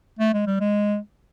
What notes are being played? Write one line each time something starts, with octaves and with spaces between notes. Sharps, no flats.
A3
G#3
G3
G#3